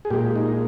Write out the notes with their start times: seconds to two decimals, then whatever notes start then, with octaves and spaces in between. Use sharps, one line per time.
0.05 G#4
0.10 A#2 G#3 G4
0.36 D#4